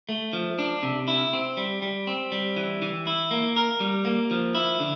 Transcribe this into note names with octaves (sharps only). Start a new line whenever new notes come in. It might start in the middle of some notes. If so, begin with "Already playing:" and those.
A3
F3
D4
C3
E4
C4
G3
G3
C4
G3
E3
E3
E4
A#3
A#4
G3
A#3
F3
E4
D3